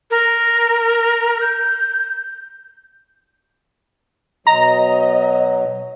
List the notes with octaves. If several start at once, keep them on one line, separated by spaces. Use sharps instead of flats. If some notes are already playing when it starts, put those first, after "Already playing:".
A#4
G6
B2 F#3 D#5 A#5